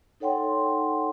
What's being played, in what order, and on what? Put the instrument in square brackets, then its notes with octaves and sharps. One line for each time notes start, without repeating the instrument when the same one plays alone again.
[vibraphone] D#4 A4 C#5 F#5 G5 C6